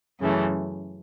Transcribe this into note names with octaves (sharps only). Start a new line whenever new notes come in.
F#2 C#3 E3 A3